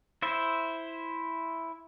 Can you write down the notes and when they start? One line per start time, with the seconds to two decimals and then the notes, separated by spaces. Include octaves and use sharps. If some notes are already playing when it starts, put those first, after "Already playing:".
0.22 E4 C5 E5